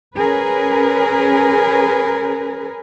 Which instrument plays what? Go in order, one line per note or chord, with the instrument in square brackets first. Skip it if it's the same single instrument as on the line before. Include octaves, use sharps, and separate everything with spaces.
[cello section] C#4 G#4 A#4 B4